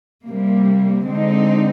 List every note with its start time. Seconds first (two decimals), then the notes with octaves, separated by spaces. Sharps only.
0.24 C3 G3 A#3
1.05 D3 G#3 C4 D#4